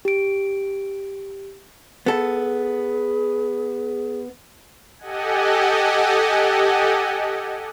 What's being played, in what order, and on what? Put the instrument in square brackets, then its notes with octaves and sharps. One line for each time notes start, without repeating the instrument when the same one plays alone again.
[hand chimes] G4 D7
[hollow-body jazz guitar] B3 A4 [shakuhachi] G#4
[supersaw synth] G4 A4 D#5 F#5 G#5